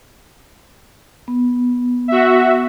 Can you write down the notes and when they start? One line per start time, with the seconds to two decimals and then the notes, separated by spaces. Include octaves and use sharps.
1.28 B3
2.08 F#4 E5